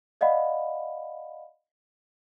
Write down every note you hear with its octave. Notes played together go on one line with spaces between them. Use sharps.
D5 D#5 F5 F#5 B5